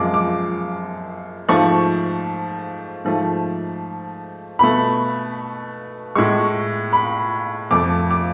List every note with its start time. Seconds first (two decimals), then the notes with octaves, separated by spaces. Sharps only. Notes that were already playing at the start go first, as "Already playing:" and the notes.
Already playing: F#2 F3 G#3 D6
0.14 D6
1.49 G#2 F3 A3 C#6
3.05 G#2 F3 A3
4.59 B2 A3 B5
6.15 A2 G#3 C#6
6.93 B5
7.71 F2 F3 A3 D6
8.11 D6